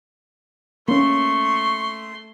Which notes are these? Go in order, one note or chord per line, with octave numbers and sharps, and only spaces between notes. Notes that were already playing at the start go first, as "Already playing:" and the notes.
A3 A#3 C#4 C6 C#6